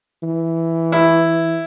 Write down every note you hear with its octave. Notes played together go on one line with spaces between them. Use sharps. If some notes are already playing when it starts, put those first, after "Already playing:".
E3
E4